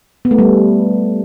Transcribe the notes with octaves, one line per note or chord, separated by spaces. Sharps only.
B3
A3
G3